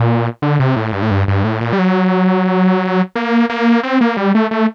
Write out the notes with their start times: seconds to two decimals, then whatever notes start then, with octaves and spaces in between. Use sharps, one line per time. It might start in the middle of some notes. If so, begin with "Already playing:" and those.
Already playing: A#2
0.42 D3
0.60 C3
0.76 A2
0.93 G2
1.02 A2
1.11 G2
1.28 G2
1.44 A2
1.61 A#2
1.73 G3
1.79 F#3
3.15 A#3
3.49 A#3
3.83 C4
4.01 A#3
4.17 G3
4.35 A3
4.51 A3